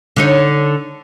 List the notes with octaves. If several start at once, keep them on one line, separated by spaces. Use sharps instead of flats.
D3 D#4 C#5